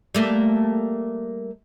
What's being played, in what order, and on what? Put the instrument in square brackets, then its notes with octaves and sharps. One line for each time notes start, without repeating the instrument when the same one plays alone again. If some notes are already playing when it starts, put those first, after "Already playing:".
[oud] G3 A3 A#3